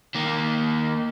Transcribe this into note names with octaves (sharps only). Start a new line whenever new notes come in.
D#3 A#3